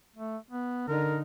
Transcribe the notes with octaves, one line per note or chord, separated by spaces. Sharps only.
A3
B3
D3 D#4 A#4